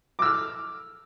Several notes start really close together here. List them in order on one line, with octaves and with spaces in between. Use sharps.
D6 E6 F6